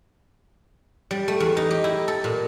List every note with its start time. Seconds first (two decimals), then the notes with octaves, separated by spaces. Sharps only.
1.11 G3
1.28 A3
1.40 E2
1.57 D#4
1.71 G4
1.84 E4
2.08 A4
2.24 A#2